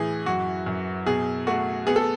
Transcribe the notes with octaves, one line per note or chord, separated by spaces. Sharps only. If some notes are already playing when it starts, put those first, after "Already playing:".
Already playing: A2 E3 G#4
F#2 F#4
F#2
B2 G#4
A3 F#4
B3 G#4
A4